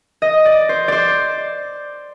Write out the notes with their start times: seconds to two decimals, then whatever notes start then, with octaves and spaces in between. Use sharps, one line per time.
0.22 D#5
0.45 D5
0.69 C5
0.88 C5 D5